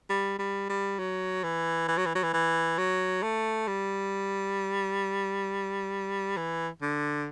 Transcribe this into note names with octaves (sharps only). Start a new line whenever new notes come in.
G3
G3
G3
F#3
E3
E3
F#3
E3
F#3
E3
E3
F#3
A3
G3
E3
D3